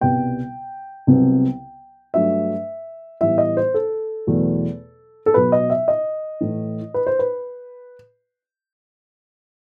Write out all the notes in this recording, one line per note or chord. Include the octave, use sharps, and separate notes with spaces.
C2 B2 G3 B3 G5
C2 C3 F#3 B3
G2 F#3 A3 E5
A2 E3 G3 B3 E5
D#5
C5
A4
E2 B2 F#3 A3
A4
B2 F#3 B3 B4
D#5
E5
D#5
A2 E3 A3
B4
C5
B4